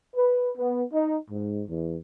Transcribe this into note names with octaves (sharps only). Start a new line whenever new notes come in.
B4
B3
D#4
G#2
E2